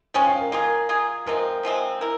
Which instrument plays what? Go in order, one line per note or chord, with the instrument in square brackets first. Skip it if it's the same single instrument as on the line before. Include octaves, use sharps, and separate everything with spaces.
[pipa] F3 G#3 C#4 [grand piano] G5
[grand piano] F5
A#4
[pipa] A#3 F4 G#4 [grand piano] A#4
[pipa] A#3 F4 G#4
[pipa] C3 F3 G#3 C4 [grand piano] A#4
[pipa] C3 F3 G#3 C4
E4 A#4